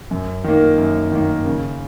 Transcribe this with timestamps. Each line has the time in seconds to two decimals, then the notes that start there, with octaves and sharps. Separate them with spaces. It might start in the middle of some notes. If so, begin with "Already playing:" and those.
0.11 F#2
0.44 D#3 A#3
0.78 F#2
1.12 D#3 A#3
1.46 C#3